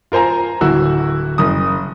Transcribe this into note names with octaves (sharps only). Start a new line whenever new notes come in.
F4 A#4 C5 G#5 A#5
D1 E4 F#4 E6
F#1 D#6